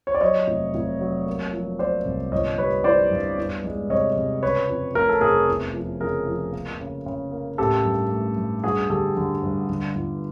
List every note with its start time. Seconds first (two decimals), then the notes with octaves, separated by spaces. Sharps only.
0.07 C#5
0.15 D5
0.21 F#3 C#5 D#5
0.47 F1
0.75 F1
1.01 F#3
1.26 A#3
1.53 F3
1.79 A#3 C5 D5
2.05 C2
2.32 G1 C#5 D#5
2.58 G3 B4 C#5
2.84 E3 C5 D5
3.11 G2
3.37 E2
3.64 G#3
3.90 C3 C#5 D#5
4.17 C3
4.43 C#3 B4 C#5
4.69 F2
4.95 F1 A#4
5.09 A4
5.21 F1 G#4 A#4
5.48 E2
5.74 F3
6.01 C#3 G#4 A#4
6.27 F3
6.53 A#3
6.80 C#3
7.06 C#3
7.32 A#3
7.58 A1 G4 A4
7.85 G2
8.11 A3
8.37 G2
8.64 G2 F#4 G#4
8.90 D3 G4 A4
9.17 D3
9.43 G2
9.69 D3
9.95 G1